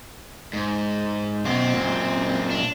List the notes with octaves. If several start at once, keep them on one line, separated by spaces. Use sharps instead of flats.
G#2
F#2 B2 C4
F#2 A#2
D4